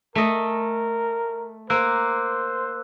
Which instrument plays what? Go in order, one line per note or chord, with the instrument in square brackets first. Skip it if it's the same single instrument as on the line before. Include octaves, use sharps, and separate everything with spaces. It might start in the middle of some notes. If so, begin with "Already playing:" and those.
[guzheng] A3 D#5 [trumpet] A#4
[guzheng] A#3 [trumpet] C5 [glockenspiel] E6 F#6